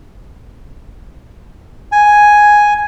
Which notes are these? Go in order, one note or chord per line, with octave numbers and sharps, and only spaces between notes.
G#5